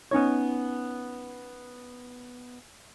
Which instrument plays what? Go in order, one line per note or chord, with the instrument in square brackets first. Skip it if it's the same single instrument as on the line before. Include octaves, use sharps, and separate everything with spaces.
[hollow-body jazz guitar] B3 C#4 D#4 C#5